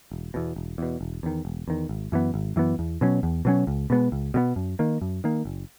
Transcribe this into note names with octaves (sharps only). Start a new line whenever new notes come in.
E1
E2 B2
E1
E2 B2
E1
E2 D#3
E1
E2 D#3
G#1
F#2 E3 B3
G#1
F#2 E3 B3
E2
B2 F#3 C#4
E2
B2 F#3 C#4
C#2
B2 G#3 B3
C#2
B2 G#3 B3
F#2
D#3 A#3
F#2
D#3 A#3
F#1